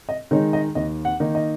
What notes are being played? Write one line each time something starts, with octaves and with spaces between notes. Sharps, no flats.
D#5
D#3 G#3 D#4 C#5
D#5
D#2 D#5
F#5
D#3 A#3 D#4
D#5